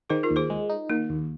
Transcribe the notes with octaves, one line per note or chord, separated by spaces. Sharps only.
D#3 G#4 C5
F4 A#4
D#2
G#4 C5
G#3
D#4
D#3 A#3
D#2